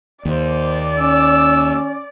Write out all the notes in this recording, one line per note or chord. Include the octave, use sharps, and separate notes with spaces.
D#2 C5 D5
C#4 E6